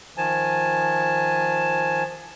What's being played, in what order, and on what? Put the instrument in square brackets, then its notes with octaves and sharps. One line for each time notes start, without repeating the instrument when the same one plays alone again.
[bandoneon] D#3 F3 G#5 A5